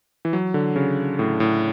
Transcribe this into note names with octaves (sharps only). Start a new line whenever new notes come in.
E3
F#3
D3
C#3
A2
A2